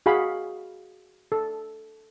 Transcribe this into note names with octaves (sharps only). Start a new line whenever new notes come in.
F#4 G#4 F5 B5
A4